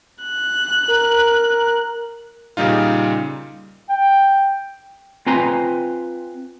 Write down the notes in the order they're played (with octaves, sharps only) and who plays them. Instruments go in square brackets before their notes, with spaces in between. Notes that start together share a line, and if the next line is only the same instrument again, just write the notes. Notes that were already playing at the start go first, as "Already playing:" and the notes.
[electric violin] F#6
[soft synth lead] A#4
[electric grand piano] A#2 C#3 G3 D#4 F4
[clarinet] G5
[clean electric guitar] C4 F4 B4 G#5 A#5 C6